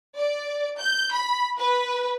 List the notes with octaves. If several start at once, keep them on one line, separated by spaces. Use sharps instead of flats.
D5
G6
B5
B4